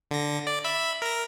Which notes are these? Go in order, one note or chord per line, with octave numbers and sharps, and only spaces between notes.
D3 A#6
D5
E5 B5
A#4 A#6